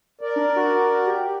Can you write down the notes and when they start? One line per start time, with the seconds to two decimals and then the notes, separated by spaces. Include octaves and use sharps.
0.21 A#4 D5
0.36 D4
0.56 F#4
1.07 G4